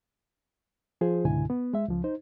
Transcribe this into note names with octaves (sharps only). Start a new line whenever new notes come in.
F3 F4 G#4 C5
C#2 G#2 B2 D3 E4 G#5
B3
G#3 E5
C#2 F3
D#4 C5